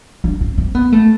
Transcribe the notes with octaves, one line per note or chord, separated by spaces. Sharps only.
D4
C4
C4
B3
A3